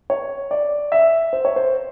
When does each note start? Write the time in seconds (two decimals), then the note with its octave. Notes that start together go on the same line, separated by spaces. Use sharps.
0.10 C#5
0.51 D5
0.92 E5
1.33 C5
1.45 C#5
1.56 C5